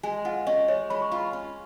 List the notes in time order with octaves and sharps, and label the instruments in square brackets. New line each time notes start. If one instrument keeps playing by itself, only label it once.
[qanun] G#3 [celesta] G#5
[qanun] F4 [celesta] F#5
[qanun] C#4 [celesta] D#5
[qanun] G#3 [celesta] C#5
[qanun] G#3 [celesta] B5
[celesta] C#6
[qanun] F4 [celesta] B5
[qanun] C#4